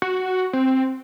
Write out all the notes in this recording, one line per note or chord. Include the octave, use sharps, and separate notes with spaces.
F#4
C4